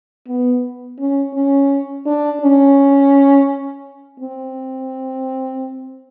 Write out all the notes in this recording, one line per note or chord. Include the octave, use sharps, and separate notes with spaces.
B3
C#4
C#4
D4
C#4
C4